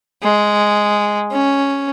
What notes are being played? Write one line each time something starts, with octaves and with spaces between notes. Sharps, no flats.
G#3
C#4